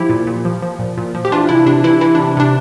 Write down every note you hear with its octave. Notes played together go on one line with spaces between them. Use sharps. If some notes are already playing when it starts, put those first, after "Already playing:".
Already playing: F3 E4 G4
A#2
A#2
F3
F3
A#2
A#2
F3
G4
E3 D4 F4
C3 E4
C3 D4
E3 E4
E3 E4
C3 D4
C3 D4